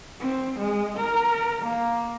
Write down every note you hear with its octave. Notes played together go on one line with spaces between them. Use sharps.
C4
G#3
A#4
A#3